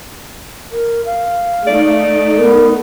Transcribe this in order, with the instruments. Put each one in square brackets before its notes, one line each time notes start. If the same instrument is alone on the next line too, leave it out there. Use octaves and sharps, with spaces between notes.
[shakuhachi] A#4
F5
[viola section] A3 D#4 [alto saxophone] D5
[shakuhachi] B3 [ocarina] A#4